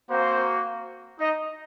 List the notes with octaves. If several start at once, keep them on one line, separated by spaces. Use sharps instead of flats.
A#3 C4 F#4 C5
D#4 D#5